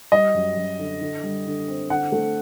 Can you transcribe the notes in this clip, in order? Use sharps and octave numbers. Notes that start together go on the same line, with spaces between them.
G3 D#5
F#2
F#2
D3
D3
G3
D3
C4
D3 F#5
A3